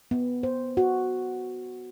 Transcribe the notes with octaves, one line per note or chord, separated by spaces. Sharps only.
B3
C5
F#4